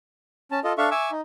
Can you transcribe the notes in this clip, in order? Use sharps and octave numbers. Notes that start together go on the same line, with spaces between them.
C#4 A5
F4 A4 D#5
D4 A4 E5 F5 C#6
E5 G#5 C#6 D6 E6
D#4